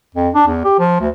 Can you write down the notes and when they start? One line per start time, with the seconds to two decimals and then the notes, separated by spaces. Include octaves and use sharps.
0.15 F2
0.34 D4
0.47 E2
0.65 G4
0.79 F3
1.01 D2